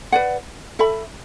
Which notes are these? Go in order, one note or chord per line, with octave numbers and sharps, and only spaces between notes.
B4 D5 F#5
A4 E5 B5